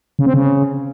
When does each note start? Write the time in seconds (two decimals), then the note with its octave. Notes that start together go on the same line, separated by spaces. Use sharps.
0.19 C#3
0.26 C4
0.34 C#3